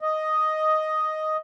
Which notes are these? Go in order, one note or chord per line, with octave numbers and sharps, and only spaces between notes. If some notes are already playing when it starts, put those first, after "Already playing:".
D#5